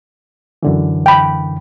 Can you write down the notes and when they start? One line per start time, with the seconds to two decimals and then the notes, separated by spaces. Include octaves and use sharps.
0.63 F#2 D3 E3
1.06 G5 B5